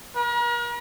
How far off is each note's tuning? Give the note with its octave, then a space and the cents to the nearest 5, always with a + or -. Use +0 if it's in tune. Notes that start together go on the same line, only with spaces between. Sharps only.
A#4 +40